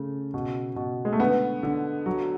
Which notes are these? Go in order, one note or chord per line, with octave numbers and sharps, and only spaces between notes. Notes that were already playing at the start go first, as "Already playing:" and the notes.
Already playing: C#3 A3
B2
B2
G#3
A3
D3 B3
D3
F#3